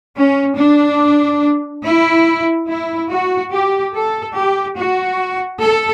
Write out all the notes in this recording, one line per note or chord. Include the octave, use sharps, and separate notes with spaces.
C#4
D4
E4
E4
F#4
G4
A4
G4
F#4
A4